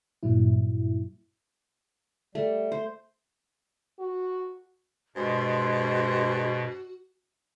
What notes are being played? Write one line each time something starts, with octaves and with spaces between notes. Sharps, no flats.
G2 A#2 F#3 E4
G3 A3
C5
F#4
G2 B2 G#3 F#4 C5